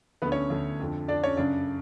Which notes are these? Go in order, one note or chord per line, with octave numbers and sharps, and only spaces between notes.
D2 D3 B3 B4
C#4 C#5
D2 D3
F2 D3
F2 D3 D4 D5
C#4 C#5
F#2 C#3 D4 D5